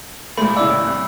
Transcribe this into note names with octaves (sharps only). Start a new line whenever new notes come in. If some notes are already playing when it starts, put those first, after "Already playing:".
A#2 G#3 A3 B5
C#3 E4 D5 D6 E6
A1
C2